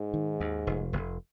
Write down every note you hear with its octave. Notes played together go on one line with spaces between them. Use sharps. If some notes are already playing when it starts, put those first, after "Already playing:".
Already playing: G#2
D#3
D#2
F1
F1